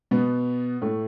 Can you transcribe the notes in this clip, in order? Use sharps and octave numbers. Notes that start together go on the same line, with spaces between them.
B2 B3
A2 A3